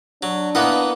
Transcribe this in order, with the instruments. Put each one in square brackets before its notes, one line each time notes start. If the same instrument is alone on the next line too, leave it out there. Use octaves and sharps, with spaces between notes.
[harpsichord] F#3 [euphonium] D4
[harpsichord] A#3 B3 D#5 [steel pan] E4 A#4 F#5